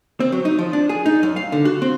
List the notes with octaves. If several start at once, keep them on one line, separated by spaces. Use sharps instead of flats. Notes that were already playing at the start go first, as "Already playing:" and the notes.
C4
F#3
D#4
F3
D4
G#4
D#4
F#2
F5
D3
F#4
C4